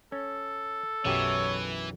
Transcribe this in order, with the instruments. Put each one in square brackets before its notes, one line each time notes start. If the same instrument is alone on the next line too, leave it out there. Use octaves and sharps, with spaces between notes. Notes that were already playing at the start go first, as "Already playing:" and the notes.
[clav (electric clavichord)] C#4 [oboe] A4
[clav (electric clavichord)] B1 F#2 G4 [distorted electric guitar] E3 [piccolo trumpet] C#5